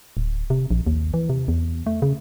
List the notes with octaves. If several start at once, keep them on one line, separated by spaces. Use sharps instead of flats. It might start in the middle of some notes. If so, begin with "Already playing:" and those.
D1
C3
A#1
D#2
E3
C3
E2
A3
C#3